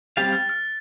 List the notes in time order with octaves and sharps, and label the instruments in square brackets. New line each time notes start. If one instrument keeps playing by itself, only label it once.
[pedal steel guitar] G3 C4 G4 F5 [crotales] A6
[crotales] F6
F6